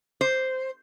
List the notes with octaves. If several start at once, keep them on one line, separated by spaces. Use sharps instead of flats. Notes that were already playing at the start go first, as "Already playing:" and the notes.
C5